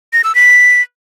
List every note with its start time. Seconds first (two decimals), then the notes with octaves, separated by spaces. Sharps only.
0.13 A#6
0.24 E6
0.35 B6